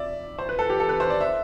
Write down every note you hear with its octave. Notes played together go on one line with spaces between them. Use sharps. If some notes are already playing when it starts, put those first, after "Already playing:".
Already playing: D5 E5
C5
B4
A4
G4
A4
B4
C5
D5
E5